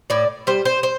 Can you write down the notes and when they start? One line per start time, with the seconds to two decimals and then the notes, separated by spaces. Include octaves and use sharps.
0.10 A2 D5
0.47 G3 C5
0.65 C5
0.83 C5